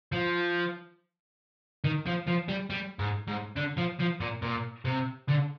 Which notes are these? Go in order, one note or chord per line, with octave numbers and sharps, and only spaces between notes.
F3
D#3
F3
F3
G3
G3
G#2
G#2
D3
F3
F3
A#2
A#2
C3
D3